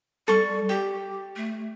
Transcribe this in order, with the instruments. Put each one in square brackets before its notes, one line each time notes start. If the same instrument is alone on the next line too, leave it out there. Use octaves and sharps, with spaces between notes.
[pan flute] G3 [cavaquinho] A4 C#6
[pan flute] G4 [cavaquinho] G5
[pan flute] A3